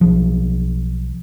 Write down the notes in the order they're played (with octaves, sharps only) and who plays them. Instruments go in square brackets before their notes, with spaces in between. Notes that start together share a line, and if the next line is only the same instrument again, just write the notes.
[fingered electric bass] B1 F3